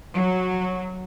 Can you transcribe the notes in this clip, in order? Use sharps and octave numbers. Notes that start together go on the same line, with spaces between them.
F#3